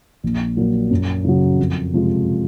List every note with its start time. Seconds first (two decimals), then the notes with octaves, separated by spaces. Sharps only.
0.23 A#1
0.57 A#2 F#3 A#3
0.91 F#2
1.25 C#3 F#3
1.58 F2
1.93 C3 F3 G#3